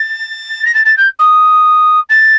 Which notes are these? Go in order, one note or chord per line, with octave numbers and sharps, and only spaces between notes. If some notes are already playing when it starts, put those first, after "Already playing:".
Already playing: A6
A#6
A6
A6
G6
D#6
A6